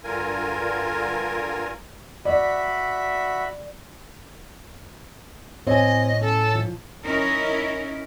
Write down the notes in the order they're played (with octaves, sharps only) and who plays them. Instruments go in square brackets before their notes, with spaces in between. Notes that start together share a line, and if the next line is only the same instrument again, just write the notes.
[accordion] G2 D3 F4 A#4 G#5
[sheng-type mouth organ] F#4 E5 B5 [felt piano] D5
[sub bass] A2 [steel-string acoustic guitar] C4 G#5 [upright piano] C#5 [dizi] D#5
[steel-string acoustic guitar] C#4 [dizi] A4
[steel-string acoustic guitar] F3
[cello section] C#4 D#4 E4 A#4